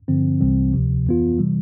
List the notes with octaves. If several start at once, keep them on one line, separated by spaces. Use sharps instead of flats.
G2 D3 F3 C4
C2 C3 E3 G3 C4
D2 C3 F3
F2 E3 B3 F4
C3 E3 G3